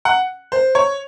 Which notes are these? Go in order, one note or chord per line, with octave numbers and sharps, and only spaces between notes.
F#5
C5
C#5